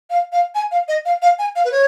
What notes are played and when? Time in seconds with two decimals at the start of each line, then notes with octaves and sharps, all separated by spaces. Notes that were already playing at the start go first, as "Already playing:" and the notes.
0.10 F5
0.32 F5
0.55 G#5
0.71 F5
0.88 D#5
1.05 F5
1.22 F5
1.39 G#5
1.56 F5
1.65 B4
1.72 C#5